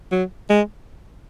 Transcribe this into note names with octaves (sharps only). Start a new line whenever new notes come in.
F#3
G#3